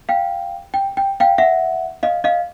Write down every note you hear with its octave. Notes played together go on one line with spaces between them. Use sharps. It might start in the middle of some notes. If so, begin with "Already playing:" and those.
F5 G5
G5
G5
F5 G5
E5 F#5
D#5 F5
D#5 F5